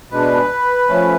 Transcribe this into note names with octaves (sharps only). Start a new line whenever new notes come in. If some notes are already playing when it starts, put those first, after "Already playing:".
B2 G#3 D4 B4
F3 A3 C#4